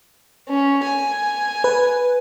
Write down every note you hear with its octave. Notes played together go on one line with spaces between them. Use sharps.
C#4
G#5
B4